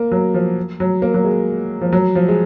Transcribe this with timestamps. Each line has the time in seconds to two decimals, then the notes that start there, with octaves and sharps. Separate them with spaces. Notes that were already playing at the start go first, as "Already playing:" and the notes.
Already playing: A#3
0.12 F#3
0.34 F3
0.80 F#3
1.02 A#3
1.14 F#3
1.25 G#3
1.82 F3
1.93 F#3
2.15 F3
2.28 G#3